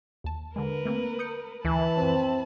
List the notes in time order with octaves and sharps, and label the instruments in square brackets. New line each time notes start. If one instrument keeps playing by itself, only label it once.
[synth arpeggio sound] D#2 A5
[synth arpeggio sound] D3 G#3 [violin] A#4 B4
[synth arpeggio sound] A3 A#3 C4
D#6 G6 C#7
[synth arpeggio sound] D2 [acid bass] E3 [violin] A5 B5
[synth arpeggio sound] F#2 F3 [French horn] C4